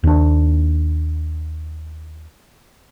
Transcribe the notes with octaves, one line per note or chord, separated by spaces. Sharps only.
D#2 D4